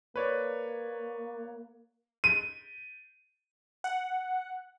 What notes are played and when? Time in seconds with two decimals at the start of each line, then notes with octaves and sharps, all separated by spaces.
0.16 A#3 B4 C#5 D5
2.24 D#7
3.84 F#5